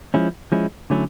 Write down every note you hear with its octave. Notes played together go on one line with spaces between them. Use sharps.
F3 G#3 C#4 E4
F3 G#3 C#4 E4
D3 F#3 A3 C#4 E4